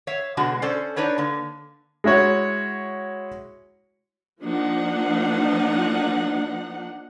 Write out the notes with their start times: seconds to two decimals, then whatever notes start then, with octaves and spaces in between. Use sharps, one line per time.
0.07 C#5 E5 F5
0.37 B2 D3 G#3 F#4
0.62 C#4 A4 C5 D5
0.96 D4 D#4 B4 C#5 D5
1.18 D3 A#3
2.04 G#3 E4 F#4 C#5
4.42 F3 A#3 D4 D#4 F#5